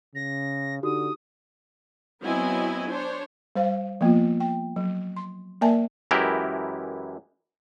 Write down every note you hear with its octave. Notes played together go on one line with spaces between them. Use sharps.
C#3 A#6
D3 D#4 F#4 G4 D#6
F#3 B3 C4 E4 D#5 G#5
D4 C5 C#5
G3 C5 F5
F3 A#3 B3 F4
G5
F#3
C6
A#3 A#4 D5 E5 G#5 A5
F#2 E3 G#3 E4 G4 A#4